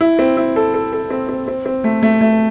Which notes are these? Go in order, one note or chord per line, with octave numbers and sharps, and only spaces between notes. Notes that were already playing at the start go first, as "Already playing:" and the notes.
E4
C4
E4
A4
A4
A4
C4
C4
C4
C4
A3
A3
A3